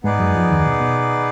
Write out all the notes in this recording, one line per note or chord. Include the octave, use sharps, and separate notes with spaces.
G#2 G#3 B3 D#4 G#4 B4 D5
F#2 F#3
F2 F3
D#2 D#3
B2
B2